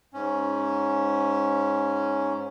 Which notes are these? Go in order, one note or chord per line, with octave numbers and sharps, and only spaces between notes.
G#2 C#4